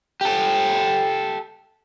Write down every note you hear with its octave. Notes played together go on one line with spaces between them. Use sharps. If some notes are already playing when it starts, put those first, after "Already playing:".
G4 A4